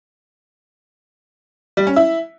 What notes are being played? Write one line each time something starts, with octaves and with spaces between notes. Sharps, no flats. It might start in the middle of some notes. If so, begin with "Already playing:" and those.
G3
C#4
E4